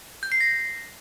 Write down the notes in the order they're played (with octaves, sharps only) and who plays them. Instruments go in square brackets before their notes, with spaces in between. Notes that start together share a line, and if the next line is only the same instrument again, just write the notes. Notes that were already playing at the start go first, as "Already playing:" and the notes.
[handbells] G6
C7
A#6